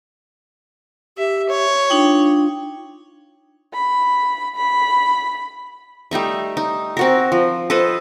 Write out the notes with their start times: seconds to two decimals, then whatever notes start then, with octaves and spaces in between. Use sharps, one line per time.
1.18 G4 E5
1.49 C#5
1.90 D4 D#4 F4 G5
3.74 B5
4.56 B5
6.11 G3 A3 D#4 E5
6.57 D#4
6.97 C4 F#4 A#4
7.32 F3
7.70 A4 B4 C5 D#5